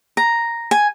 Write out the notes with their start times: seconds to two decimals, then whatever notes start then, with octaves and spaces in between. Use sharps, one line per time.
0.17 A#5
0.71 G#5